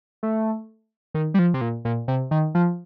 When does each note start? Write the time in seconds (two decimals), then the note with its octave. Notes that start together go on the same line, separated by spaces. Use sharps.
0.23 A3
1.14 D#3
1.34 G3
1.39 F3
1.54 C3
1.61 A#2
1.85 A#2
2.08 C3
2.31 D#3
2.55 F3